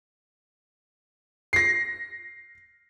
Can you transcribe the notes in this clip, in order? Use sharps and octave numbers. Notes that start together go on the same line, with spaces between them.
A#6 C7